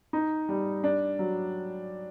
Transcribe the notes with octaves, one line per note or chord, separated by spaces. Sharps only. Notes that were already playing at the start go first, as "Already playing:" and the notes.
D#4
G3
D4
F#3